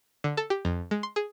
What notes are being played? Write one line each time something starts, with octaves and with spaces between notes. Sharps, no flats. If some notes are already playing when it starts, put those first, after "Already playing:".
D3
A4
G4
F2
G#3
C6
G#4